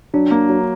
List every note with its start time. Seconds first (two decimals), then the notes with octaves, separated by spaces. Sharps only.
0.14 F#3 D4
0.31 A#3
0.49 F#3